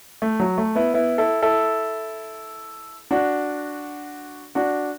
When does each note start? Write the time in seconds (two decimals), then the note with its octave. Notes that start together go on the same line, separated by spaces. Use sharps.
0.22 A3
0.40 F#3
0.58 A3
0.75 B3 E4
0.94 B3 E4
1.18 E4 A4
1.43 E4 A4
3.11 D4 F#4
4.55 D4 F#4